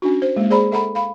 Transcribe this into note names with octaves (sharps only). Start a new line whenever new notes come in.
C#4 D4 F#4
C5
G#3 A#3
G#4 C5 D5 A#5 B5
A4 E5 F#5 A#5 B5
F5 B5